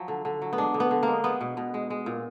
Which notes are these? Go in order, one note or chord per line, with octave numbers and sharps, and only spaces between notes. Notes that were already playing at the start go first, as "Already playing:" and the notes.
Already playing: F3 F#3
D3
D3
F#3
B3
G#3 D4
D3
B3
D3
G#3 A#3
G#3 B3
B2
B2
G#3
G#3
A#2